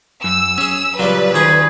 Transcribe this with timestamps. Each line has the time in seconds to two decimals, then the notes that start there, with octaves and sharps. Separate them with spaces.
0.24 F#2 E6
0.58 C#4 G#4 C#5
0.99 A#2 C#3 F#3 G3 B4
1.34 D2 D#3 G#4 A#5 C#6